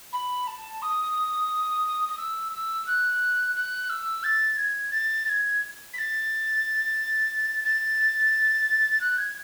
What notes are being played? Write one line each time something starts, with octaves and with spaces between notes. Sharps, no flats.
B5
A5
D#6
D#6
E6
E6
F#6
F#6
E6
A6
G#6
A6
A6
G#6
B6
A6
A6
F#6
G#6